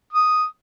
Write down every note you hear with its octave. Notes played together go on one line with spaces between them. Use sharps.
D#6